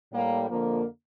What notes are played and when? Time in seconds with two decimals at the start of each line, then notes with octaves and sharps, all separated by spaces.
0.13 A2 G3 A#3
0.49 F2 D3 F3 A#3